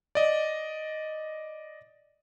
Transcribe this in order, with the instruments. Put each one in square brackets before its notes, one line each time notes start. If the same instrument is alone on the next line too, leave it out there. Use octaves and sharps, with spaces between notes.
[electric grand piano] D5 D#5